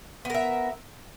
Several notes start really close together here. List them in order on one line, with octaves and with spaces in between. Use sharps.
B3 A#4 E5